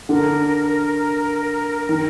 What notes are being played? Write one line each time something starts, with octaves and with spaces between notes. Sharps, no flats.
D3 A#4
D#3